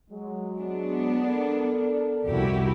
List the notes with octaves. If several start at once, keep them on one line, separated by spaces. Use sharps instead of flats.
F#3 G#3
B3 D4
A4 A#4 D5
C2 F2 E4 F#4 G4